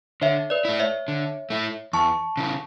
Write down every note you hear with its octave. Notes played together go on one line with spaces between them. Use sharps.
D3 C#5 E5
B4 D5
A3 E4
C#5 E5
D3
A3 E4
E2 A5 C#6
C#3 E3